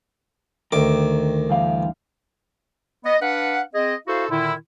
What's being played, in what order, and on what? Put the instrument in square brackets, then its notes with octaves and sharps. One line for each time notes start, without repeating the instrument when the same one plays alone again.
[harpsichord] D2 D6 [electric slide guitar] D#3 A#4
[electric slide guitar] G2 E3 F5
[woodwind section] B3 D#5
D4 B4 F5 F#5
C4 G#4 D#5
E4 F#4 A4 C5 F5
A#2 D3 D#3 E4